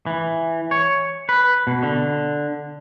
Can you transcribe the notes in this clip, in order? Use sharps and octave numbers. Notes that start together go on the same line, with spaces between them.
E3
C#5
B4
B2
D3